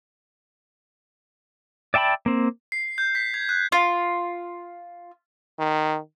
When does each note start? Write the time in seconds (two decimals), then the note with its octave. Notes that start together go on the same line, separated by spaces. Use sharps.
1.94 D5 E5 G5 A5 B5
2.26 A#3 C4
2.72 C7
2.98 G6
3.15 B6
3.34 G#6
3.49 F#6
3.72 F4
5.59 D#3